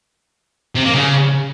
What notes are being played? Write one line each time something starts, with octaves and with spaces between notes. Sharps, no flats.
C3
A#3
C#3